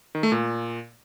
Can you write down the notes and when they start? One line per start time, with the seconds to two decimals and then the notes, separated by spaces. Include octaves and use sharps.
0.15 D#3
0.23 A3
0.32 A#2